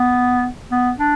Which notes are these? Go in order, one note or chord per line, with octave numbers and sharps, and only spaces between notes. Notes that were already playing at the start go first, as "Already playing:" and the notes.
Already playing: B3
B3
D4